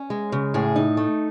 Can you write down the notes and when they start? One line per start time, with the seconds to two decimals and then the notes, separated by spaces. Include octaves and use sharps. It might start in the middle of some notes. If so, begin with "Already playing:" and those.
Already playing: C#4
0.10 G#3
0.32 C#3
0.54 A2 G#4
0.76 D#4
0.97 A3